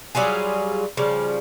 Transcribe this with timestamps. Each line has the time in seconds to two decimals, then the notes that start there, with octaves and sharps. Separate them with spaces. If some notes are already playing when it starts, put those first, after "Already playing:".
0.15 F#3 G3 F4 G#4
0.97 C#3 F3 G3